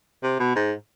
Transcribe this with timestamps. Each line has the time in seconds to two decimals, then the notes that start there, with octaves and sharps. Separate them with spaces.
0.23 C3
0.39 B2
0.56 G#2